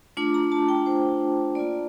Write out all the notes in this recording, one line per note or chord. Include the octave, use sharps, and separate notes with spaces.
A3 D4 F4 D6
A#5
A5
G5
C5
A#3 F4 D5